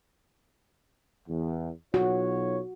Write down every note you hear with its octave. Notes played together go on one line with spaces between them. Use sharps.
E2
B1 F4 F#4 C#5